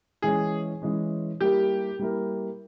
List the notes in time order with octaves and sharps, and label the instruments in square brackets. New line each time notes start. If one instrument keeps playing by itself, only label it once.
[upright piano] E3 G#3 C#4 [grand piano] G#4
[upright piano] E3 G#3 C#4
[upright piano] G3 A#3 E4 A#4 [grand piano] G4
[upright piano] G3 A#3 E4 A#4